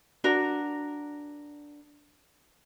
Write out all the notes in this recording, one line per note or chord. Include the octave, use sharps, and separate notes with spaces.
D4 F#4 A#4